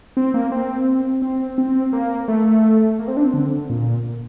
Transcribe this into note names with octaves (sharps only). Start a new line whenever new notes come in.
C4
A#3
C4
C4
C4
A#3
A3
A#3
C4
D4
C4
D3
A#2